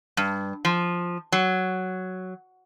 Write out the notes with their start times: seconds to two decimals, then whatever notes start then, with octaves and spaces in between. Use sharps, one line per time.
0.17 G2
0.65 F3
1.32 F#3